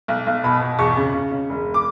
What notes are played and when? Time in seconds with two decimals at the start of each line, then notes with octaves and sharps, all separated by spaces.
0.08 B1
0.26 B1
0.44 B2 B5
0.61 B2
0.79 E2 C#6
0.97 C#3
1.14 C#3
1.31 C#3
1.49 E1
1.74 D6